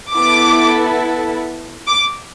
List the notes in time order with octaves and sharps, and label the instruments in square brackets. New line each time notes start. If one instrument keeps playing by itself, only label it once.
[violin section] B3 E4 A4 D6
D6